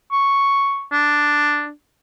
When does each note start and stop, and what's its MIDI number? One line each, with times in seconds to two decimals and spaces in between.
0.12 0.85 85
0.92 1.70 62